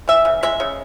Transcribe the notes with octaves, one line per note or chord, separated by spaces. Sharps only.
E3 E5
C#3
G#3 E5
C#3